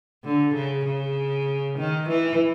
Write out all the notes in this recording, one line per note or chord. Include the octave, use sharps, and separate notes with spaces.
D3
C#3
C#3
D#3
E3